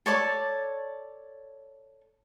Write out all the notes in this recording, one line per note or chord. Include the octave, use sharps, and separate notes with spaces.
A4 C#5 D5 A5